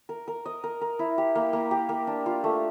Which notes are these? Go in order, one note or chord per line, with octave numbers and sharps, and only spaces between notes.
A#4
A#4
D#5
A#4
A#4
E4
G4
A#3
A#3
G4
A#3
D4
F4
A3